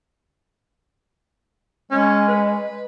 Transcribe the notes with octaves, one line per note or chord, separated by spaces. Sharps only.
G#3 C#4
B4